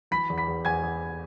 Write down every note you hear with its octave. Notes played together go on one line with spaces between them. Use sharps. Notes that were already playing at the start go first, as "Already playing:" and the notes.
E3 B5 B6
E2
B5 B6
E2
E2 G#5 G#6
E2